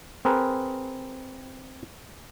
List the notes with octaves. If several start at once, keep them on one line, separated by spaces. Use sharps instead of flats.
C4 G#4 A#4 B4